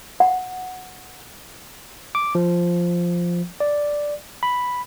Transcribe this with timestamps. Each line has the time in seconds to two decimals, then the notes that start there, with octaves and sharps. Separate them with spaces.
0.20 F#5
2.15 D6
2.35 F3
3.60 D5
4.43 B5